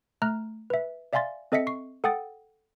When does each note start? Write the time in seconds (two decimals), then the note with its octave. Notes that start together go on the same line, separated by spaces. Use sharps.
0.22 A3 A#5 F6 F#6
0.70 B4 E5
1.13 D5 E5 F5 G#5 C6 A6
1.52 C4 A4 D#5 E5 B6 C#7
1.67 C#6 C7
2.04 A4 F#5 G5 D#6 A6